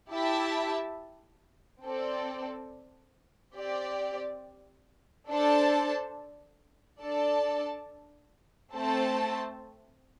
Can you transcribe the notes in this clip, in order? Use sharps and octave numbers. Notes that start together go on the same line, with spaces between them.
E4 G4 E5 A5
C4 A4 D5
C4 G4 D5
D4 A4 C5 A5
D4 A4 D5 A5
A3 C4 A4 C5 A5